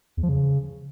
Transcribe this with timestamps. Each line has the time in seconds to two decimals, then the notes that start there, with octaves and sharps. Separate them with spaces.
0.17 E2
0.23 F3
0.29 C#3